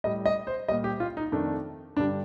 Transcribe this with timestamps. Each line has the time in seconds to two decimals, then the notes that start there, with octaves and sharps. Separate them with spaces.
0.04 A2 G3 D#5
0.26 D#5
0.47 C5
0.68 A#2 G3 D#5
0.84 G4
1.00 F4
1.17 D#4
1.32 F2 D#3 A3 D4
1.96 G2 D3 G3 D4